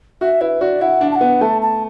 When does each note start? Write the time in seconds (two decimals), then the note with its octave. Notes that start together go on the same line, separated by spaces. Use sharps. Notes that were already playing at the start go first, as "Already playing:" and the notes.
0.21 F#4 E5
0.41 E4 B4
0.60 F#4 D5
0.81 E4 F#5
1.01 D4
1.11 A5
1.15 F#5
1.21 B3
1.41 A3 A5
1.61 A5